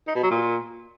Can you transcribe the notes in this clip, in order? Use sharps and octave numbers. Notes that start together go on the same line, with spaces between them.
D#4
B2
F#3
A#2